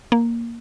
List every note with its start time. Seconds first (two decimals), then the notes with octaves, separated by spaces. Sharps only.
0.12 A#3